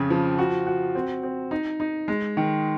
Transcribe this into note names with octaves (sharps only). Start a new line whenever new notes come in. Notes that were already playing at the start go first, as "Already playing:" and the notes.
Already playing: F2 C#3
F3
F#4
F#4
C4
C4
D#4
D#4
G#3
D#3